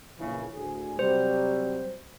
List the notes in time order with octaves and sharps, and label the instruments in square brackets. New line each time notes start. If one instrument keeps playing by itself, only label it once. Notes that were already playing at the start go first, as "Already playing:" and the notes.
[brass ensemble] A#1 C#3 E3
D2 A2 G#4
[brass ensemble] C3 F#3 G3 [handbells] C5